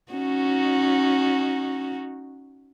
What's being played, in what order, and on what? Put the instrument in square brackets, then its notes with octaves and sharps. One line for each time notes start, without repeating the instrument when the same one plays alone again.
[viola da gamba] C#4 D#4 F#4